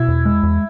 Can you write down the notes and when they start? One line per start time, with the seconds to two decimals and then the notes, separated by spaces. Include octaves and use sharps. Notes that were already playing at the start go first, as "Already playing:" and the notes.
Already playing: B2 E4
0.08 E2
0.25 G#3
0.43 E2